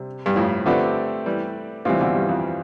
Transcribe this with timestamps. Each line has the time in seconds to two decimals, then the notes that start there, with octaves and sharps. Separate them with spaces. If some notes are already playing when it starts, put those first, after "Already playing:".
Already playing: C3 G3 C4
0.26 G2
0.36 F2 A2
0.66 D3 F3 A3 C4 G4 B4 D5
1.26 E3 G3
1.85 A2 C3 E3 G3 C4 F4
2.00 B2 D3
2.15 G2
2.29 F2